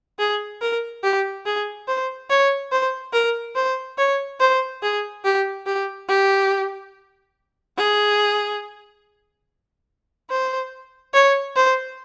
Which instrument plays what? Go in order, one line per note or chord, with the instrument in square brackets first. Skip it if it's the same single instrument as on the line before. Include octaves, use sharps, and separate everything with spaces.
[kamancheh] G#4
A#4
G4
G#4
C5
C#5
C5
A#4
C5
C#5
C5
G#4
G4
G4
G4
G#4
C5
C#5
C5